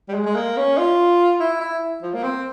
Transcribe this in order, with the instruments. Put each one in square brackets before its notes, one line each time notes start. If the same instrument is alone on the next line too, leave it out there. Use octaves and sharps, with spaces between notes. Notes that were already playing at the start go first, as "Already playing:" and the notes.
[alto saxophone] G3
G#3
G#3
A#3
C#4
F4
E4
E4
F3
A#3
C4